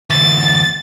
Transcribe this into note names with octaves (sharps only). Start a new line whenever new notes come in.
D2 E3 A6